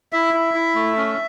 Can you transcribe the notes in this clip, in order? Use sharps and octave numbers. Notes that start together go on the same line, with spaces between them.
E4 E5
E4
E4
A3
C#4